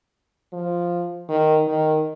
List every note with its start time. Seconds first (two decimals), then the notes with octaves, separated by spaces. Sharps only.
0.53 F3
1.29 D#3
1.68 D#3